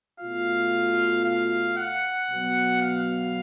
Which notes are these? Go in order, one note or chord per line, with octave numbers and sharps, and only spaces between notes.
B2 A3 F4 F5
F5
F#5
B2 F#3 B3
F5